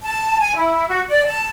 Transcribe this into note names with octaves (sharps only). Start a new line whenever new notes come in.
A5
G#5
E4
F#4
D5
A5